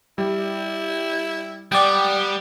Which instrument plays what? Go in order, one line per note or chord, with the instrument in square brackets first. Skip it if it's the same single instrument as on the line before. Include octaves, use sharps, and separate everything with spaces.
[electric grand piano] G3 [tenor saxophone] E4
[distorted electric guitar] G3 [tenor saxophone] B3 [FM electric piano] D5 G5